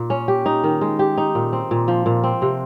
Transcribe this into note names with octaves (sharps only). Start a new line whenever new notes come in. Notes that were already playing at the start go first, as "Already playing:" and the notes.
Already playing: A#2
C#4
G4
D#4
D#3
G#3
G4
D#4
A#2
C4
A#2
F3
A#2
C4
C3